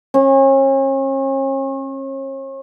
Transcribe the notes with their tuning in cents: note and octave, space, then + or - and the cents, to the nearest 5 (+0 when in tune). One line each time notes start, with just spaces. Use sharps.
C#4 -40